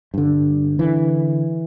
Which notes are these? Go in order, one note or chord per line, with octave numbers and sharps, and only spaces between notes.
G2 D3
D3 E3